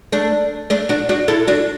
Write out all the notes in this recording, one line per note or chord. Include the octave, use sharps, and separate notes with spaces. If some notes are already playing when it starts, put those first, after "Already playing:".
A3 D4
A3 D4
D4 F#4
D4 F#4
E4 A4
D4 F#4